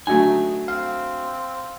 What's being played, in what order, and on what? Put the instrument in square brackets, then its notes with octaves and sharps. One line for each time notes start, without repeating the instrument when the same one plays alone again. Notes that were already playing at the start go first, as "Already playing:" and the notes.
[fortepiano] D3 F#3 A3 [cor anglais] D#4 [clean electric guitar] G#5
[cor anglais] C4 [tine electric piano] F5